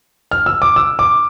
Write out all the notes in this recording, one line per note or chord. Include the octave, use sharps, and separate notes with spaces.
F6
E6
D6
E6
D6